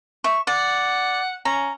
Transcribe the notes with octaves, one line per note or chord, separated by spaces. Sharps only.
E5 C#6
D5 F#5
C#4 A#5